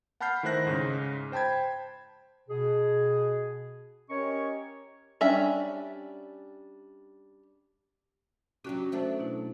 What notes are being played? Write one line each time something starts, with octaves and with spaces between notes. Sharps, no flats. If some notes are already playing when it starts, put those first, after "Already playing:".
F#5 A5 B5 F6 G6 C7
D#3 A3 E4 C5 F#6 A#6
G#2 C#3
C5 G5 A5 B5 G#6
B2 G#4
C#4 G4 A#4 C#5 D#5 C#6
G3 C#4 D4 E5
F#3 C#4 D4 F#4 G4
F#3 A3 D4 C5 A5
B2 E4